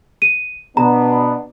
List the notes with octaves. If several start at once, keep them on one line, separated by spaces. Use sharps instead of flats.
D#7
B2 B3 D4 A#5